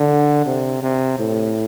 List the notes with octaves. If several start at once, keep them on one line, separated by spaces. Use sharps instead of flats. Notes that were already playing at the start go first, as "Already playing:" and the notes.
Already playing: D3
C3
C3
A2